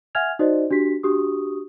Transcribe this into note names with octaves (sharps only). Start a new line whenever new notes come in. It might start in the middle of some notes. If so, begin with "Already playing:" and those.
E5 F#5 G#5 F6 G#6 F7
D#4 F#4 C5 D5 D#5
D4 F#4 G4 B6
D4 F#4 G4 C#6 D#6